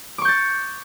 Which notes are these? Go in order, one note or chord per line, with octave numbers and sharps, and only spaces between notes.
C#6 D6 G6 A6